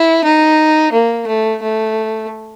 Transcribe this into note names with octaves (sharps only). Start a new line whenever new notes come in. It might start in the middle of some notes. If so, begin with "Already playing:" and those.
Already playing: E4
D#4
A#3
A3
A3